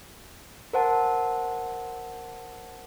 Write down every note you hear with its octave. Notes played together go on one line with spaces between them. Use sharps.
A#4 C5 F#5 A5